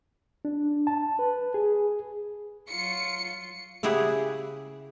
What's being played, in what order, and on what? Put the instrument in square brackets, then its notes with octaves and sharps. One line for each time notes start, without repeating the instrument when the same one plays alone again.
[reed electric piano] D4
A5
B4
G#4
[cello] F#3 F4 [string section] C#7
[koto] C#3 E4 G4 G#4 F#5